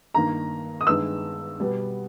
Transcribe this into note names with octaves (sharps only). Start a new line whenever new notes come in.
G2 D#3 A#3 A#5
D#6
G2 D#3 G#3 B3 E6
B2 G3 B3